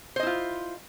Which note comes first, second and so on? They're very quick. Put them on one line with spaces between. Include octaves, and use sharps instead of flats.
C5 D#5 E4 F4